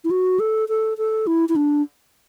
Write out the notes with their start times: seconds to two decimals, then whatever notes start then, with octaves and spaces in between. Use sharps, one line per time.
0.04 E4
0.11 F#4
0.40 A4
0.69 A4
0.98 A4
1.27 E4
1.49 E4
1.56 D4